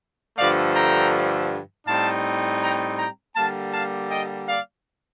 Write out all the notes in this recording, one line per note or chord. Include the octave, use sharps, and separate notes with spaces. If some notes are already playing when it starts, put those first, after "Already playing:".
G2 D3 F3 A3 D5 F5
G5 A#5
A2 G3 C4 D#4 F5 A5
G5 A#5
G5 A#5
D3 G3 A#3 F5 A5
F5 A5
D#5 G5
D5 F5